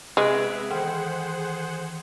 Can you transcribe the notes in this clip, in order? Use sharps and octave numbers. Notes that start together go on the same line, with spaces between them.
C3 G#3 B3 D#5 E5 F#6 D7
D#3 E3 G#4 C5 F#5